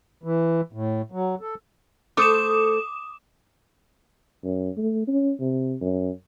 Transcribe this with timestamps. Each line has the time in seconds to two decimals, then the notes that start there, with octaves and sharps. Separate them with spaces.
0.23 E3
0.73 A2
1.12 F#3
1.41 A4
2.17 A3 A4 C5 D6 D#6 E7
4.44 F#2
4.77 A3
5.07 C#4
5.40 C3
5.81 F#2